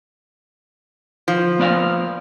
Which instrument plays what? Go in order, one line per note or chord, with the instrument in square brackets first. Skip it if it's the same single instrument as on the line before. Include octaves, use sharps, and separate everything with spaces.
[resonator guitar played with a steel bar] F3
[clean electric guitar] B3 D5 F5